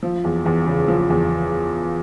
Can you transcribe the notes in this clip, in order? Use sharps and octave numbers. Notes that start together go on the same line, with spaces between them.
F3
E2
E2
C#3
F3
E2